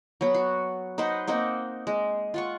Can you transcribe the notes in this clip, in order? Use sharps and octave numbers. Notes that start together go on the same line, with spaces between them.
F#3 B3
F#4
D#4 B4 C5 F#5
A#3 C4 D#4 F#5
G#3
F4 F#5 C#6